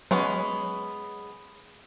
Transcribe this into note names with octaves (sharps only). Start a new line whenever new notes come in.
F#3 G#3 B3 C#4